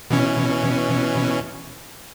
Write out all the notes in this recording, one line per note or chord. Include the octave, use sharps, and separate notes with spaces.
B2 E3 C#4